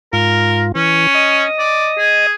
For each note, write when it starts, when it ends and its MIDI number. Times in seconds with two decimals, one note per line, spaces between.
0.13 0.72 44
0.13 0.72 65
0.13 0.62 70
0.75 1.07 52
0.75 1.44 61
1.15 2.27 75
1.15 2.27 87
1.59 1.91 74
1.98 2.33 68